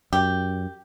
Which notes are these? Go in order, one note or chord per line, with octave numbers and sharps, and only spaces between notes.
F#2 G4